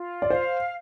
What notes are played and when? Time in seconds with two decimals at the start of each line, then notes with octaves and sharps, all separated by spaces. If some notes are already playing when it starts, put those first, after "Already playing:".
Already playing: F4
0.22 D5
0.30 C5 F5